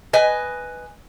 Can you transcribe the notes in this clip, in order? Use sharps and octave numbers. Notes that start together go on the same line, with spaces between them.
B4 D#5 G#5